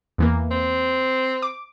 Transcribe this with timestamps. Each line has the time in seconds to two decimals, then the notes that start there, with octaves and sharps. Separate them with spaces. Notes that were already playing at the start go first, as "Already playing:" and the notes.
0.18 E2 E3 A#3
0.51 C4
1.42 D6